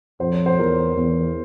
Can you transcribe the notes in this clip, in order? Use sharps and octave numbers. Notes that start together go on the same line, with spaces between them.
F2 C5
C#5
C5
E2 A#4
E2